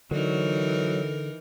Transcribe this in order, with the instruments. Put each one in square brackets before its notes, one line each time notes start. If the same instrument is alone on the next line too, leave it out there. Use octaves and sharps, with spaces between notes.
[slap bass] D3 [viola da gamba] E3 D#4 A#4 [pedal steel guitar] F#3